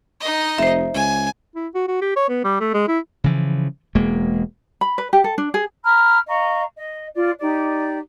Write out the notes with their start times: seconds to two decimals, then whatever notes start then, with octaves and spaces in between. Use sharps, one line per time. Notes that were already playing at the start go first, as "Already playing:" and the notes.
0.20 D#4 D#5
0.58 F1 C5 E5
0.94 C#2 G#5
1.56 E4
1.75 F#4
1.88 F#4
2.02 G4
2.16 C#5
2.29 B3
2.45 G3
2.60 A3
2.74 G#3
2.88 E4
3.24 C#3 E3 F3
3.95 E1 G#3 A#3
4.81 B5
4.98 B4
5.13 G4
5.24 A4
5.38 D4
5.54 G#4
5.83 A#5 B5 F6
6.27 D#5 F5 A#5 C#6
6.76 D#5
7.14 F4 D5
7.39 D#4 G4 D5